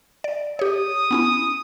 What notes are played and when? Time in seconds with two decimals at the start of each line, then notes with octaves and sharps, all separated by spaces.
0.24 D5
0.59 G4 C#5 D#6
1.11 B3 C#4 E4